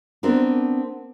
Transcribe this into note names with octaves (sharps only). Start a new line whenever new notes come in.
B3 C4 D4 A#4